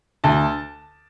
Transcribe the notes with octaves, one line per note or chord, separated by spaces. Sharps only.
D2 A5